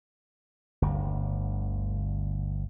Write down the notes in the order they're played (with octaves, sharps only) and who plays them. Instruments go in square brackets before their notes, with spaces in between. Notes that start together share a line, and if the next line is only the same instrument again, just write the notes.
[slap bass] G1 D2